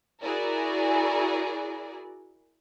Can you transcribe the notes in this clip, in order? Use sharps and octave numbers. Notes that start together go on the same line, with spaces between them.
E4 F#4 G#4 A#4 D5